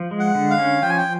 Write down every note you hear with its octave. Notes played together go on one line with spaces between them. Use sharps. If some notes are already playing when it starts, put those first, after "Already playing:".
Already playing: F3
G#3
F#5
D3
F5
C#4
F3 G5
G#5
G5